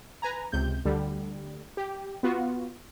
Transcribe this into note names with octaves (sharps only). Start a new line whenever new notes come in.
B4 G#5 A#5
C#2 C3 G6
D2 D3 G3
G4
B3 F4 F#4